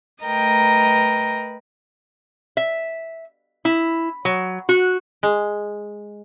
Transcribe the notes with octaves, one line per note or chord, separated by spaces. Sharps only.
A3 A#4 B4 D#5 G5 A#5
E5
E4
F#3
F#4
G#3